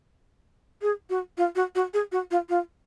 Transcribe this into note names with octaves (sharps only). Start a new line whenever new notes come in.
G#4
F#4
F4
F#4
F#4
G#4
F#4
F4
F4